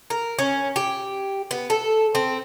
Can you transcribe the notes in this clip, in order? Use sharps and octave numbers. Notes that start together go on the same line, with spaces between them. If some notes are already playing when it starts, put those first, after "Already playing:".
A#4
C#4
G4
B3
A4
C4